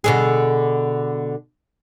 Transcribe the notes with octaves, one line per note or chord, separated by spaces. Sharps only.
B2 D3 G#4